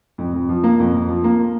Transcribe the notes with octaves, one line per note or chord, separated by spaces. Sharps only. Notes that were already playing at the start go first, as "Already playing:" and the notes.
F2
F2
F3
A#3
F2
F2
F3
A#3